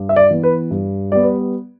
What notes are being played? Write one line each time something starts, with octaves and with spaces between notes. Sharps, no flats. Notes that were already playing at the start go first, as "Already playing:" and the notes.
Already playing: G2
E5
D5
E3 B3
B4
G2
G3 B3 D5
B4